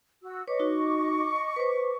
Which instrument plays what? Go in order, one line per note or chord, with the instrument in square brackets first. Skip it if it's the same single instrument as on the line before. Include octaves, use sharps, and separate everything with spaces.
[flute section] F#4 E6
[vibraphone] B4 C#5 [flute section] D#5 C#6 D6
[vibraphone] D#4 F#4
B4 C5